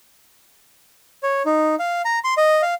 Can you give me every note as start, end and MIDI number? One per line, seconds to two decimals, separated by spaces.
1.23 1.43 73
1.46 1.75 63
1.79 2.02 77
2.05 2.19 82
2.24 2.34 84
2.37 2.62 75
2.62 2.74 77